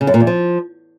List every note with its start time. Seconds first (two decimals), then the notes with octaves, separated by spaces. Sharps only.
0.01 C#3
0.07 F#2
0.14 A#2
0.20 E2
0.27 F3